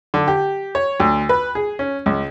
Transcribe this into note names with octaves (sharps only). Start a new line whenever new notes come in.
D3
G4
C#5
D2
B4
G#4
C#4
C#2